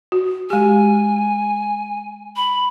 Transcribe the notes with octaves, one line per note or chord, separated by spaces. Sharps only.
F#4
G#3 G4 G#5
B5